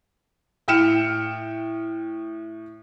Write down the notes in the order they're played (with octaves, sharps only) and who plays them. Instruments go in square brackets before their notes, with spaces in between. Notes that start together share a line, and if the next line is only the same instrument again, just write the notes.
[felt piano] A2 G5 F6 C#7 E7